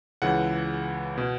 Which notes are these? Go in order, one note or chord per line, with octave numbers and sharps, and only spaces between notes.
C#2 C#3 E3 F#5
B2